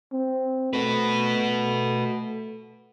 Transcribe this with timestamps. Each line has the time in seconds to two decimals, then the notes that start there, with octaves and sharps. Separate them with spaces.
0.12 C4
0.73 A3 F#4 B4